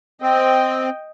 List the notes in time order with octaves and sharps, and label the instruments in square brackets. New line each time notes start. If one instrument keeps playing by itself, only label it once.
[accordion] C4 [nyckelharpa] D#5 G5